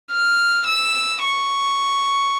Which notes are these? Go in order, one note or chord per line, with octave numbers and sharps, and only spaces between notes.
F6
E6
C#6